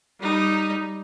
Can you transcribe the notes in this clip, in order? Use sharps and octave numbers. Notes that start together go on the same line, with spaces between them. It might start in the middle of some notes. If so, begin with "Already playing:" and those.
G3 D#4